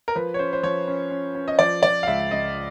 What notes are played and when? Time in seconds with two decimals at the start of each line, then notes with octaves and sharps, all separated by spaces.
0.08 A#4
0.15 F3 B4
0.34 C#5
0.39 C#4 C5
0.53 C5
0.63 F3 C#5
0.88 C#4
1.11 C#4
1.35 C#4
1.48 D#5
1.59 F3 D5
1.83 F3 D5
2.03 F5
2.07 C#2 E5
2.31 C#2 D#5